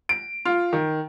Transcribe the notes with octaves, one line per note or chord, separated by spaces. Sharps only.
D7
F4
D#3